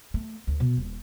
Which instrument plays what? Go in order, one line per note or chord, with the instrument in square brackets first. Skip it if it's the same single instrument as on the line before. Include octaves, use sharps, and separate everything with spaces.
[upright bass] A3
D2
B2
D#1